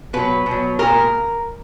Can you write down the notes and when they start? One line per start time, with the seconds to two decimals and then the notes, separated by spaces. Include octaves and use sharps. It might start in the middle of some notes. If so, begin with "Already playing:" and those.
0.13 B2 F#3 B4
0.46 B2
0.51 F#3
0.79 A#2 G#3 A#4